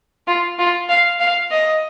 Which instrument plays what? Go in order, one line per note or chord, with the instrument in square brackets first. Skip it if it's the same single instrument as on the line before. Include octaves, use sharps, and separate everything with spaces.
[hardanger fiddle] F4
F4
F5
F5
D#5